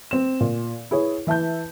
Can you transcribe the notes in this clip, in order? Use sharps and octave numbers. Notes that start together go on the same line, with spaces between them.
C4 E7
A#2
E4 G#4 B4 C#5
E3 E5 A5 G6